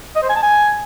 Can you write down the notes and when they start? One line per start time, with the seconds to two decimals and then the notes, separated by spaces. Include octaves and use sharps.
0.16 D#5
0.22 C5
0.29 G#5
0.36 A5
0.43 G#5